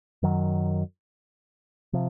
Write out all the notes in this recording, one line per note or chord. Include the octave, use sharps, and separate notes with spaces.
F#2 D#3 F#3
C3 F3